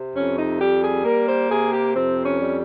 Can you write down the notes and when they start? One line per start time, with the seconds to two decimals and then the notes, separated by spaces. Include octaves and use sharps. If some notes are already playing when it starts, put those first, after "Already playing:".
Already playing: C3
0.15 F2 C#4
0.38 D#4
0.61 G3 G4
0.83 G#4
1.05 A#3 A#4
1.28 C5
1.50 C3 G#4
1.73 G4
1.95 F2 C4
2.26 C#4
2.41 G3